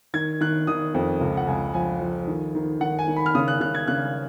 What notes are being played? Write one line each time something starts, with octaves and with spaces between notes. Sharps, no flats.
D#3 G#6
D#3 F#6
D#3 D#6
F2
C#2
F#5
C#2 G#5
F3 G#5
F3
D#3
D#3
D#3 F#5
G#5
D#3
B5
F6
C#3 D#6
F#6
C#3 F#6
G#6
C#3 F#6